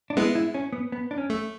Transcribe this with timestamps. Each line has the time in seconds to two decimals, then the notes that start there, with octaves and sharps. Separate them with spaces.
0.10 D4
0.17 G#3 B3 E4
0.35 E4
0.54 C#4
0.73 B3
0.92 B3
1.11 D4
1.18 C#4
1.30 A3